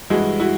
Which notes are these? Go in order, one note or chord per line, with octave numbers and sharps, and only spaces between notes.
G2 E3 G#3 E4 F#4
E4 F#4